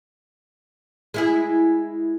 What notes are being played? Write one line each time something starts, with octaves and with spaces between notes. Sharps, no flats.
G#3 E4 G#4